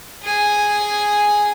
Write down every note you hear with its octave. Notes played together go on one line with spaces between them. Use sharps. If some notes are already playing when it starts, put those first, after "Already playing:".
G#4 G#5